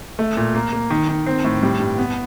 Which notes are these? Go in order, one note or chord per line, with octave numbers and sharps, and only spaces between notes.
A3
A#2
A#3
A#3
D#3
D#3
C4
A2
G3
G2
B3